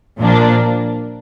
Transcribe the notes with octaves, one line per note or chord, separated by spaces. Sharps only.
A#2 F3 A#3 D4